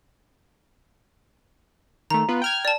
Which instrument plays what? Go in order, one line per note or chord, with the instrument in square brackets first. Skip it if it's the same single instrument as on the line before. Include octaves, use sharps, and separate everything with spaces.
[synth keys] D#3 A3 [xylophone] A#5
[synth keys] B3 F4 B4
G5 F6 G#6
[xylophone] D5 A5